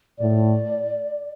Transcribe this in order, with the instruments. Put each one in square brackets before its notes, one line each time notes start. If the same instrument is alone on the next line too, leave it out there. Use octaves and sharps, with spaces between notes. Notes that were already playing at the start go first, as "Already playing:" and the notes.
[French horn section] A2 [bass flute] D5